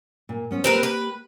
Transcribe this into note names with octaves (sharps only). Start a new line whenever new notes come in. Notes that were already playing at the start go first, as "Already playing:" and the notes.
A#2
B3 C#4 C5
A#3 C4 G4 A#4 B4
B4